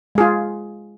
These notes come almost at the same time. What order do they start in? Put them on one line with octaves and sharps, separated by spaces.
G#3 G#4 F4